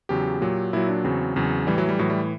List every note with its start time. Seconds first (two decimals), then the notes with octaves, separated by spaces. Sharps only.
0.09 E2 C#3 F#3 G4
0.41 A#2 F#3
0.73 A#2 F#3 E4
0.89 D4
1.04 E2 C#3 F#3 C4
1.36 E2 C#3 F#3
1.67 A2 E3 G3
1.78 F#3
1.89 G3
1.99 A2 E3 F#3
2.10 G3